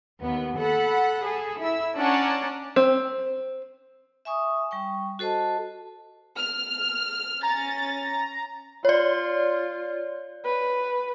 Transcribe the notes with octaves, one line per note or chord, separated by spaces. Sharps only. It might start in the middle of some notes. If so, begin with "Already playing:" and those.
D#2 B3
A4 F#5 B5
G#4 A4
E4 E6
C#4 D4 D5 F#5 A5 A#5
C4
E5 G#5 C#6 D#6
G3 G5 C#6
F#4 A4 C5 D#5 A5
F6
C#4 A#5 A6
F4 C#5 D5
B4